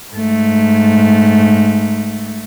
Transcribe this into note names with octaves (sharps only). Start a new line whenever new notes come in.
G#2 A3